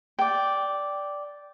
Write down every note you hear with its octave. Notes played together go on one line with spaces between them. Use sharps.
D5 G5